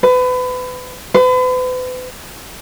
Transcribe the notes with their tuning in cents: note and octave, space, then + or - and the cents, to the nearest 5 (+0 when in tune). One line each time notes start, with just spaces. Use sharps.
B4 +30
B4 +40